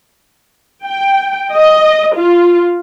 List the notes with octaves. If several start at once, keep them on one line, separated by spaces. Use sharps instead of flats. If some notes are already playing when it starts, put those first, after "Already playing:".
G5
D#5
F4